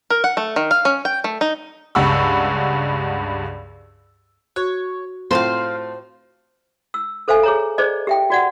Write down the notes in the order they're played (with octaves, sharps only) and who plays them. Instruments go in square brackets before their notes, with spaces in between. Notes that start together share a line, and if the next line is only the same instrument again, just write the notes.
[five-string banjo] A#4
F#5
A3
D#3
F5
C#4
G5
A3
D#4
[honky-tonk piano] C#2 G2 F#5 B5 C#6 E6
[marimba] F#4 [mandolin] C#5
[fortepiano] A2 C4 F4 [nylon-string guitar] C5 [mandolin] F5 G5 C6
[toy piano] E6
A4 C5 E5 F5 G#5
G#4 C#5 A#5
G#4 C5 D5 D#5
G4 E5 G5
F#4 D5 F#5